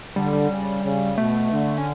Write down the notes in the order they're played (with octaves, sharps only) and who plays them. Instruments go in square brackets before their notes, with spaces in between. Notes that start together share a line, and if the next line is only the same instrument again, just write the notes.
[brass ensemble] D3 [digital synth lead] G3
[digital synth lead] G3
[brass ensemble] C#3
C#3
[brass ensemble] B2 [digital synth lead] A3
[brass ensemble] D3
[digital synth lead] C#4